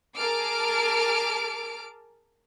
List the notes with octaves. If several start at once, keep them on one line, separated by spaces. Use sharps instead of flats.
G#4 A#4 A5 D6 F6 D7